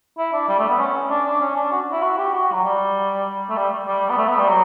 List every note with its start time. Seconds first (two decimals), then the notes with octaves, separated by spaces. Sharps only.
0.18 E4
0.33 D4
0.49 G3
0.59 A3
0.69 B3
0.79 C#4
1.10 D4
1.26 D4
1.41 C#4
1.56 D4
1.72 F#4
1.92 E4
2.02 F#4
2.18 G4
2.33 F#4
2.53 F#3
2.64 G3
3.49 A3
3.57 G3
3.87 G3
4.10 B3
4.18 A3
4.28 B3
4.38 G3
4.49 F#3